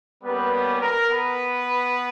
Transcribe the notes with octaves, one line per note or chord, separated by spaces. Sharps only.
G3 A#3 B3 C#4 G4 B4
B3 B4
A#4
B3 B4